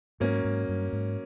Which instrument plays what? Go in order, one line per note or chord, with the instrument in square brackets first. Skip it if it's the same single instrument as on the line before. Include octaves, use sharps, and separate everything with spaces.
[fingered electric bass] G#2 [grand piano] F#3 A#3 C#4
[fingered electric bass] G#2
G2
G#2